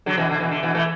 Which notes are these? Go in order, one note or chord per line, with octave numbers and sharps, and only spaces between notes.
D3 F#3
B2 E3
D3
B2 E3
D3
B2 E3
E3 A3